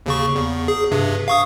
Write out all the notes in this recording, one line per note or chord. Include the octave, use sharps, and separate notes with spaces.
D#2 C#3 C#6
E2
G#4
G2 C3
F5 C#6 D#6